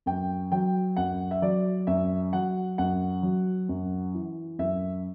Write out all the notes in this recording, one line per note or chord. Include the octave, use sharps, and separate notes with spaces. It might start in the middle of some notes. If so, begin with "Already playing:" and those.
F#2 G5
F#3 G5
F#2 F#5
E5
F#3 D5
F#2 E5
F#3 F#5
F#2 F#5
F#3
F#2
E3
F#2 E5